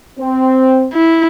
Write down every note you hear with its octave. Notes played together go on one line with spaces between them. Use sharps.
C4
E4